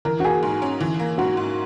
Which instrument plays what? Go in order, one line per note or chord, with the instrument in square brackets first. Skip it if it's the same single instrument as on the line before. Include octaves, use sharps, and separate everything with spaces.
[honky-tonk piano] E3 [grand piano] A#4
[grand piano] F#4
[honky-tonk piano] A#3 [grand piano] G#4
[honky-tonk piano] G#2
C#4
E3
A#3
[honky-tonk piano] G#2 [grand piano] F#4
[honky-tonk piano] G#2